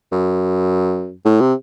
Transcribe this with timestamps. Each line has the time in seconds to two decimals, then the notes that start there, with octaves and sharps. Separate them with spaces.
0.12 F#2
1.25 A2
1.40 C3